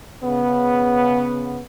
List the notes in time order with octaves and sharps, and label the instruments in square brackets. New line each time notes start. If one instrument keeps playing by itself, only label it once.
[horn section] C#3 B3